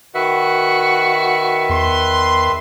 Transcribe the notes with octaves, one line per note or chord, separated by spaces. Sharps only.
D#3 F#4 B4 E5
E2 C6